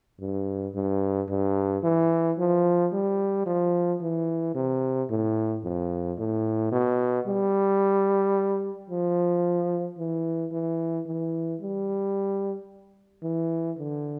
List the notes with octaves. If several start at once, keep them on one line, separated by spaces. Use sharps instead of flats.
G2
G2
G2
E3
F3
G3
F3
E3
C3
A2
F2
A2
B2
G3
F3
E3
E3
E3
G3
E3
D3